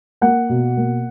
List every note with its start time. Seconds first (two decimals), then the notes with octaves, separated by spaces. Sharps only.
0.21 A#3 F#5
0.49 B2
0.77 A#3